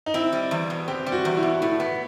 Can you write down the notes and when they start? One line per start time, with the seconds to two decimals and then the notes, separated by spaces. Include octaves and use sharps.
0.06 D#4
0.14 C4 E4
0.32 G3
0.51 E2
0.70 B2
0.88 C4 G4
1.06 G3
1.12 F#4
1.25 E2
1.37 E4
1.43 B2
1.61 A2 E4
1.80 B3